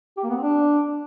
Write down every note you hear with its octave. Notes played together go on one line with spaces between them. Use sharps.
G4
A#3
B3
C4
D4